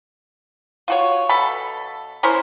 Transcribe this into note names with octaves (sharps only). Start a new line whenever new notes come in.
F4 F#4 C#5
B2 A4 B5
C#4 E4 A#4 C5